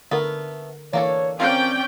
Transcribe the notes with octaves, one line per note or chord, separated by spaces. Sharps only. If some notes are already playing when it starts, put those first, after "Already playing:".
D3 A3 B3 A#4
E3 A#3 D4 A4 C#5
C4 C#4 F4 A#4 D5 G5